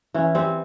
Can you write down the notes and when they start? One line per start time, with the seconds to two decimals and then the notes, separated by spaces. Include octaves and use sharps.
0.14 E3 C#4
0.35 G3 C4